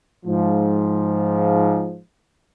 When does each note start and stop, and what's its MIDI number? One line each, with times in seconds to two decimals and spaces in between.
0.24 1.98 44
0.24 1.98 53